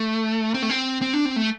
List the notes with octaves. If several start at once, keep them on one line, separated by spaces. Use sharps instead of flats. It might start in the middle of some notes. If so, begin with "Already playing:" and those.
Already playing: A3
C4
A3
C4
C4
D4
C4
A3